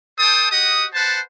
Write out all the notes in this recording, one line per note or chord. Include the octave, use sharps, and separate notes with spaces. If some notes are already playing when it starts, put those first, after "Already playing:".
A4 C5 G5 A5 D#6
F#4 G4 D#5 F#5 D#6
B4 C5 F#5 A5